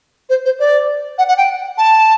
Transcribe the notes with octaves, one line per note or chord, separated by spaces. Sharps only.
C5
C5
D5
F#5
F#5
G5
A5